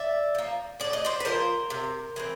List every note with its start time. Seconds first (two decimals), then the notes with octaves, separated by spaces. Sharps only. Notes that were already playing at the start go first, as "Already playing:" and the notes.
Already playing: D5 E5
0.35 F3 A#3
0.80 A2 D5
0.93 D#5
1.05 C5 D5
1.20 B4
1.25 F3 A#3 A#4 C5
1.70 C3
2.16 E3 G#3 C4